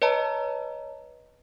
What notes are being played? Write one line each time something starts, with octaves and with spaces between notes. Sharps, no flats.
B4 C#5 D#5 A5 A#5